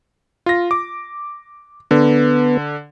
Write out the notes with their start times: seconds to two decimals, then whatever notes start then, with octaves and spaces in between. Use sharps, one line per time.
0.46 F4 A#6
0.71 D6
1.91 D3 B3